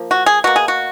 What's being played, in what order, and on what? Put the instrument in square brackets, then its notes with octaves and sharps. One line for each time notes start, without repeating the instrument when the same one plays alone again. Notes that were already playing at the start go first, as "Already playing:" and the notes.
Already playing: [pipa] F3 A#3
F#4
G#4
B2 A#3 F#4
G#4
F#4